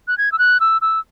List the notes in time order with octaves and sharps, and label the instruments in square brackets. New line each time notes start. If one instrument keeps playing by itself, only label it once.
[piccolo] F#6
G#6
E6
F#6
E6
E6